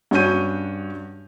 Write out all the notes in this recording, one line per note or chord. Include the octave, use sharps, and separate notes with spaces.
G2 C#4 F#4 C#5 G6 D#7